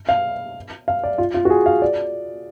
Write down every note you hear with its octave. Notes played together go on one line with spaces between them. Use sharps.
F5
F5
D5
F4
F4
F#4
G#4
F5
D5